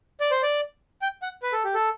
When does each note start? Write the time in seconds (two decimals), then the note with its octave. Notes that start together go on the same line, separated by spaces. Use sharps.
0.20 D5
0.31 C5
0.43 D5
1.02 G5
1.22 F#5
1.43 B4
1.53 A4
1.64 G4
1.74 A4